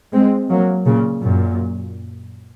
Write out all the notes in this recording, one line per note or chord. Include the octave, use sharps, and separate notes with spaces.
G#3 C4
F#3 A#3
A#2 C#3
F#2 A#2